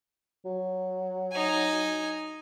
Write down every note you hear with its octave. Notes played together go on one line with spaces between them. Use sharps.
F#3
D#4 G#5